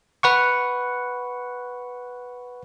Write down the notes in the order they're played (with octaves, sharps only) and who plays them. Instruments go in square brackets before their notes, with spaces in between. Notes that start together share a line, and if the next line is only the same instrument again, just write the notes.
[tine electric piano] B4 F#5 C#6